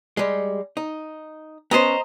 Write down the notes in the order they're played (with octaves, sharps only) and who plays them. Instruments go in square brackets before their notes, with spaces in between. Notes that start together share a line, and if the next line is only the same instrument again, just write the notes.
[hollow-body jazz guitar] G3 G#3
D#4
[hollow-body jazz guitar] B3 C#4 [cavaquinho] C5 D#5 A#5